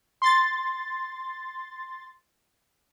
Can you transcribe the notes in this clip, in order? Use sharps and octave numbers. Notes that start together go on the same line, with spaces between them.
C6 A6